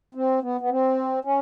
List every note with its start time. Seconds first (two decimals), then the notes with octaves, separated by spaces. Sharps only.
0.15 C4
0.43 B3
0.61 B3
0.70 C4
1.25 C#4